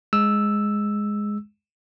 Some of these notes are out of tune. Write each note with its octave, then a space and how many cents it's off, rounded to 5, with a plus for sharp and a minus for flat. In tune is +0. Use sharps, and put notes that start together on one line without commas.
G#3 +0 E6 +0